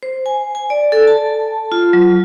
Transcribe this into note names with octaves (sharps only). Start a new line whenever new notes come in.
C5
G#5
G#5
D5
A4
A5
F4
F#3